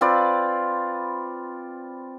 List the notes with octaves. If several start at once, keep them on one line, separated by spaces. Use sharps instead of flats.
C4 F4 B4 D5